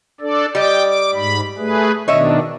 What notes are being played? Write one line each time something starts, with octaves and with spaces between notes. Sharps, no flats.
D4 A4 D5
G3 D5 D#5 G5 D6
D6
G#2 B5
A3 G#4 B4
B2 D#3 D4 C#5 D#5 E5